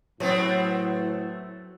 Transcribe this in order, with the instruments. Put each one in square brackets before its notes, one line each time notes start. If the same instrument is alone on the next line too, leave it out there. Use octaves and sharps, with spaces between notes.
[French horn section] A2 E4 [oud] F#3 [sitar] A3 B3 C4